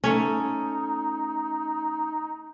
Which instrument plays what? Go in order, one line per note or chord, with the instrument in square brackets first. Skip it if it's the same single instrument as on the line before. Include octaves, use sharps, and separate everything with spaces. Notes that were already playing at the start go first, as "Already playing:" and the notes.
[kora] A3 C#4 [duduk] D#4